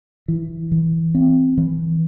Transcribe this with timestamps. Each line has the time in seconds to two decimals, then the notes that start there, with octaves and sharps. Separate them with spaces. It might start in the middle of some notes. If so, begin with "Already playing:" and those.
0.28 E3
0.72 E3
1.15 C4
1.57 E3